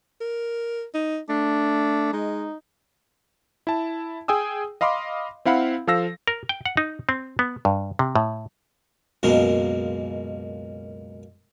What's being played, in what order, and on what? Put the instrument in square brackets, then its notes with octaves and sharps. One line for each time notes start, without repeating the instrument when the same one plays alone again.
[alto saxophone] A#4
D#4
[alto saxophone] A3 [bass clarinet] D4
[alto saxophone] G#3 [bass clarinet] D#4
[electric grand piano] E4 A5
G#4 G5 G#5 D#6 E6
D#5 F5 B5 C6 D6
C4 E4 F5 F#5 B5
F3 A4 F5 E6 A#6
[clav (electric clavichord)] A#4
G5
F#5
D#4
C4
B3
G2
C3
A2
[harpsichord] C#2 F#2 B2 G#3 A#3